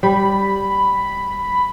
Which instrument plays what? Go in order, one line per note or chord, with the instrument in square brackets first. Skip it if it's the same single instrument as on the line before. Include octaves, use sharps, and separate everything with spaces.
[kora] G3 [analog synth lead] B5